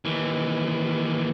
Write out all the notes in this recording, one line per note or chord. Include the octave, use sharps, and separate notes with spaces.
D#2 E3